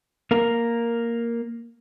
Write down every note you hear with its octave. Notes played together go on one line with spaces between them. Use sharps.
A#3 A#4